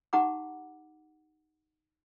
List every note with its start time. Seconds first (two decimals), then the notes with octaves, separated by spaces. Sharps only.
0.13 D#4 G4 F#5 A#5 D6